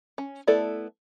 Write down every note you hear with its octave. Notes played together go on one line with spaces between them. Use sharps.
C#4
A3 B3 E4 A4 D5